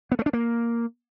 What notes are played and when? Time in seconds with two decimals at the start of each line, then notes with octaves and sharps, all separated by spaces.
0.12 B3
0.19 A3
0.26 D4
0.33 A#3